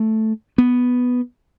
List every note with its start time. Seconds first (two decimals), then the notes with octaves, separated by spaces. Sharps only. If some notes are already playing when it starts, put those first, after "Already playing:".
Already playing: A3
0.58 B3